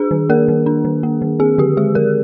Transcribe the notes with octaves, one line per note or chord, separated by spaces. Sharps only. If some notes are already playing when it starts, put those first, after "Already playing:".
Already playing: D4 G#4
D#3
A#3 A#4
D#3
D4
D#3
A#3
D#3
C4 G#4
D3 G4
G#3 G#4
D3 A#4